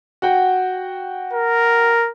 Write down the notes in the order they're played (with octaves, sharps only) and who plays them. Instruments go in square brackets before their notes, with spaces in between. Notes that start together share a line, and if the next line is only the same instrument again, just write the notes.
[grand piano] F#4 F#5 G5
[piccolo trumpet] A#4